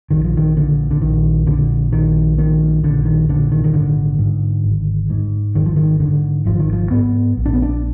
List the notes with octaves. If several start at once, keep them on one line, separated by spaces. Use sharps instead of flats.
A#1 D#3
F3
D#3
A#2 D3
D3
A#1 D#3
A#2 D3
A#1 D#3
A#2 D#3
A#1 D3
D#3
A#2 D3
D#3
D#3
G#1 D3
G#2
G#1
G#2
G#1 D#3
F3
D#3
G#2 D3
G#1 F3
D#3
F3
G#2 B3
A#1
D4
B3
D4